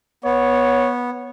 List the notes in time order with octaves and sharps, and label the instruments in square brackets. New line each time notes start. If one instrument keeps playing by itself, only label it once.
[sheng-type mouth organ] B3 [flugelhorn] C#5